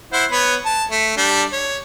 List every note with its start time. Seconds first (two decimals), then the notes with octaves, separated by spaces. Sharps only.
0.13 E4 C5 F#5
0.31 B3 B4 C#5
0.65 A5
0.91 A3
1.17 G3 D4
1.52 C#5